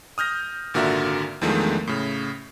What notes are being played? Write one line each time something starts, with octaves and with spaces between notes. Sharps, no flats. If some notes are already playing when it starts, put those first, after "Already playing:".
D#6 F6 G6 A#6
G#1 A#2 D3 F#4 A#4 E5
E2 D3 D#3 F3 G#3 A3
A2 C#3